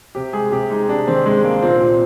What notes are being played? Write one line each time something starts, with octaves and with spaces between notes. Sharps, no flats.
C3 G4
G#3 G#4
C3 G4
G#3 D#4
C3 D4
D#3 C4
C3 G#3
G#3 A#3
A#2 C4
A#2